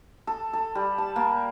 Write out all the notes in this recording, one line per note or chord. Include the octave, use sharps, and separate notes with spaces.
A4
A4
G3
A5
A#3